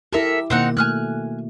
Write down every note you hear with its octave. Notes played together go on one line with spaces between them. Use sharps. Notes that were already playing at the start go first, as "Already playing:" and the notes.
E4 G4 A4 A#4 E5
B2 D#3 A#3 C4 D#4 F#5
A3 G#5 F6 F#6